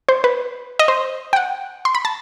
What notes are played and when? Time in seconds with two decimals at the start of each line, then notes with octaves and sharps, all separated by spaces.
0.09 C5
0.24 B4
0.79 D#5
0.88 C5
1.33 G5
1.36 F#5
1.85 C6
1.95 B5
2.05 A5